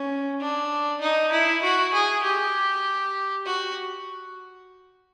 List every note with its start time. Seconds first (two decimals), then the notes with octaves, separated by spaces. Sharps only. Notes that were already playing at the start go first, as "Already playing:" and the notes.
Already playing: C#4
0.40 D4
1.01 D#4
1.32 E4
1.63 F#4
1.93 G#4
2.23 G4
3.45 F#4